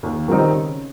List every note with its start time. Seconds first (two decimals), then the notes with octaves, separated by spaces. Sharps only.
0.03 D#2
0.28 D#3 G3 C4 D#4
0.53 C#3